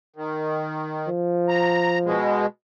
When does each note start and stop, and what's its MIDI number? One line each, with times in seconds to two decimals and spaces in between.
0.16 1.10 51
1.08 2.16 53
1.49 1.98 82
2.05 2.46 47
2.05 2.46 56